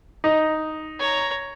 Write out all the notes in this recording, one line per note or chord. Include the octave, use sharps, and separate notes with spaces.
D#4
C#5 A#5